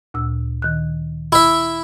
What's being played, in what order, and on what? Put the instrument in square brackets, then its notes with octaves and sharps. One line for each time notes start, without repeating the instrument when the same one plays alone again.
[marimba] D2 A#2 E6
D#3 F#6
[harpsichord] E4 E5